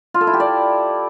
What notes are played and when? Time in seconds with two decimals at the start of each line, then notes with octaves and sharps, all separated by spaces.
0.14 F4
0.21 A4
0.27 E4
0.34 G4
0.40 D5